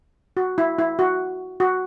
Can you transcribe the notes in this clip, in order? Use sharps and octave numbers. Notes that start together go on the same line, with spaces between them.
F#4
E4
E4
F#4
F#4